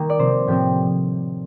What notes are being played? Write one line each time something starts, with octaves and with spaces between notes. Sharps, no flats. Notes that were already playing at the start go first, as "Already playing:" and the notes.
Already playing: D#3 G3 A#3 A#4
D5
C3 F3 C4 C5
A2 F3 C4 G4